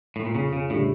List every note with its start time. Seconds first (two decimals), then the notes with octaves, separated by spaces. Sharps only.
0.16 A2
0.25 A#2
0.35 F2 C#3
0.53 C#3
0.70 A2 C#3 G3 D4